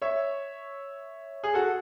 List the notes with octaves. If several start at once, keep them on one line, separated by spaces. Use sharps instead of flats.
C#5 E5
G#4
F#4 A4